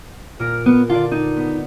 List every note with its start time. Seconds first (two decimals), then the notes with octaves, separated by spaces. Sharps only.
0.39 A#2 A#4
0.66 B3
0.90 D3 F4 D5
1.12 D#4
1.37 B3